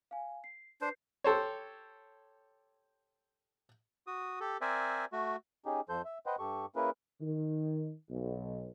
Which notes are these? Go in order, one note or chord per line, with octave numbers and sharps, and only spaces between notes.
F5 G#5
C7
D4 B4 C5 G6 C7
G4 A4 C5 C#5
F#4 D#6
G4 A4
C4 A#4 C5 D5 E5 G#5
A3 F#4
C#4 D#4 G4 G#4
F2 F3 A4 C5 G6
E5
B4 C5 D#5 F#5 G5
G2 G4 A4 C#6
A#3 C#4 E4 G#4 A#4 B4
D#3
B1